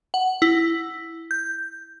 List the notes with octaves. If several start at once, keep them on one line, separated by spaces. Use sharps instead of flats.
F#5
E4
G6